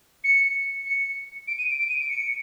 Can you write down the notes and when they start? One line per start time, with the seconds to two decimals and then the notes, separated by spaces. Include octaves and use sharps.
0.24 C#7
0.86 C#7
1.48 D7
1.58 D#7
1.69 D7
1.79 D7
1.90 D#7
2.00 D7
2.09 C#7